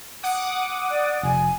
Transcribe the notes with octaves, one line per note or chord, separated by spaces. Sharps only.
F#5 D6 D#6
D5
F1 G#5